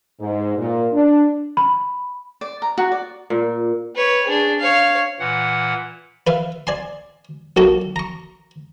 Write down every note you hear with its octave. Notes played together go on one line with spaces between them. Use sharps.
G#2
A#2
D4
B5
D5
A#5
F#4
D5
A#2
B4 C#5
D4 G#4
C#5 F5
A#2 E3 F#5
B4 E5 F5
D5 G#5 C6
B1 A#2 A#3 F#4 A4
A#5 C#6